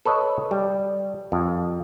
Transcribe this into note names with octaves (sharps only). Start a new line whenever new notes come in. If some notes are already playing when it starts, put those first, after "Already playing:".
A4 B4 C#5 D#5
G3
F2